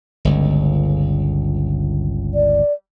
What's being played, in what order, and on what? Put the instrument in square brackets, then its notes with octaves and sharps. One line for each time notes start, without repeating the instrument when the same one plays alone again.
[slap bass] G1 C#2 [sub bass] D3
[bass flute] D5